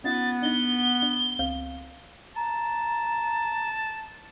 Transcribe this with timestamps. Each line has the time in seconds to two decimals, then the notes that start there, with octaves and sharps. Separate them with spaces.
0.04 B3 C#4 D#4 F4 A6
0.42 D4 D#4 G7
1.03 D4
1.39 C#2 C4 F5
2.36 A5 A#5